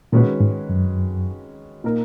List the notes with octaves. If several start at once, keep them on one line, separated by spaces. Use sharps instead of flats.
A#2 D#3 G#3 C#4 F#4 B4
G#2
F#2
A#2 A#3 D#4 A#4